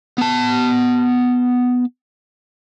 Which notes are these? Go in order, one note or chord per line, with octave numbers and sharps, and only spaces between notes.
B3 A5